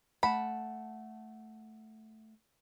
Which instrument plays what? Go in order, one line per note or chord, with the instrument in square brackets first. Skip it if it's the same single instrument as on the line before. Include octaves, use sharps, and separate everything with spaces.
[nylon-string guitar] A3 F#5 A5 [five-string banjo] B5